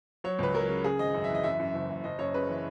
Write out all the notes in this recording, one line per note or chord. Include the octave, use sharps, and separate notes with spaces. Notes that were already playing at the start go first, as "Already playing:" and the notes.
F#3 C#5
C#2 B4
F#3 A#4
C#3
C#3 G#4
G#1 D#5
F#2
E5
E3
D#5
F#2 E5
F#2
F#1
F#1
F#1 D#5
F#2 C#5
C#3 B4
E3